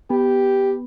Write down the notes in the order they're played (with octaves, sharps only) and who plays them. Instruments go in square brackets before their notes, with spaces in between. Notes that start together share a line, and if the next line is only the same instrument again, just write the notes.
[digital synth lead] B3 [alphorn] G4